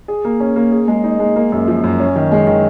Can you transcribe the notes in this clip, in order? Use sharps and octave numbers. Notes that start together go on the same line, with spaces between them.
G#4
A#3
C#4
A#3
G#4
G#3
D#4
G#3
A#3
F#2
F3
F#2
C#4
D#3
G#3
D#3